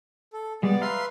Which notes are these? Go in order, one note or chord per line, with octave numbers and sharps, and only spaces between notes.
A4
G3 G#3 B3 D5
B4 E5 F5 A#5 C6 F6